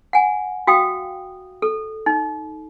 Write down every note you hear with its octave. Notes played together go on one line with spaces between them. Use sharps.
F#5 G#5
F#4 F5 G5 D#6
A4
D#4